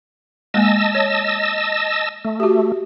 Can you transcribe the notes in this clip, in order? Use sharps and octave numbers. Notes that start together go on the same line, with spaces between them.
G#3 A#3 D#5 G#5 A5 E6
C#5
A3
F#4 G4